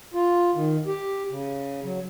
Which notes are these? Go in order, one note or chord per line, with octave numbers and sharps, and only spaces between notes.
F4
D#3
G4
C#3
F#3